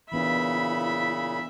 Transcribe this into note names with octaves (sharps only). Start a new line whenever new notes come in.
A#2 C#3 E3 B3 D4 E4 E5 B5